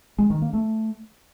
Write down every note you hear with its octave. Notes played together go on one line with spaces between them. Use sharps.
G#3
D#3
A#3
A3